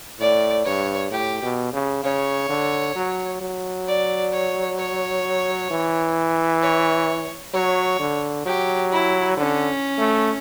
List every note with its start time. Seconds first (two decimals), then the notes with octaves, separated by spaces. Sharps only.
0.20 A2 D5
0.65 G2 C#5
1.11 A2 G4
1.43 B2
1.73 C#3
2.04 C#3 C#5
2.49 D3
2.96 F#3
3.41 F#3
3.87 D5
4.32 C#5
4.78 C#5
5.71 E3
6.63 C#5
7.54 F#3 C#5
8.00 D3
8.46 F#3 G4
8.92 E4
9.37 D3 C#4
9.99 A3